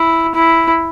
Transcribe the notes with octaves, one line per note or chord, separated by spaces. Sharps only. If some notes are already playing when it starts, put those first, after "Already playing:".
Already playing: E4
E4